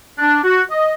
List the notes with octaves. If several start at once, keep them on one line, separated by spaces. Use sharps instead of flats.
D4
F#4
D#5